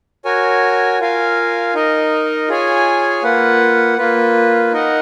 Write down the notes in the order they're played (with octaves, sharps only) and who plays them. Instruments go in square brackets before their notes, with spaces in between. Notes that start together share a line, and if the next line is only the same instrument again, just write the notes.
[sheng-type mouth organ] F#4 A#4 C#5 G#5
F4 A#4 F5 G#5
D#4 A#4 D#5
F4 G#4 C#5 G#5
A#3 F4 B4 F#5
A#3 F4 B4
D#4 A#4 D#5 F#5